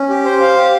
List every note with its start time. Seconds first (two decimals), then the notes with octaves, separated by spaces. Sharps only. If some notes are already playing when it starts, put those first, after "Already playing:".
Already playing: C#4
0.09 G4
0.24 C5
0.40 F5
0.57 G4